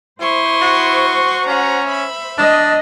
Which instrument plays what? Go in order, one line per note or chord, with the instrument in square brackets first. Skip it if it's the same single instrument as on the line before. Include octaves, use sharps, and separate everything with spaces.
[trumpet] E4 [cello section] C5 [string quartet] C6 C#6 D#6
[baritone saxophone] F#4
[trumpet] C#4 [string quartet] F#5 A#5
[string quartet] E5 B5
[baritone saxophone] D4 [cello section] D#5 [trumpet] A5